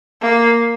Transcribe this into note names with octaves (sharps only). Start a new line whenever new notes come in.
A#3